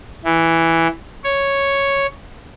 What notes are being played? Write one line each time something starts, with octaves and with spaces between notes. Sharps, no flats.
E3
C#5